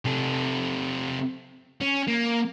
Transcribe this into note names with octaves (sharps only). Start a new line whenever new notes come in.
C3 A4
C#4
A#3